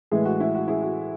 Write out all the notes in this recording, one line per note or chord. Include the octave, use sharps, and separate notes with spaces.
A2 E3 G#3 E4 G#4
F#4
E4
F#4
E4 G#4
F#4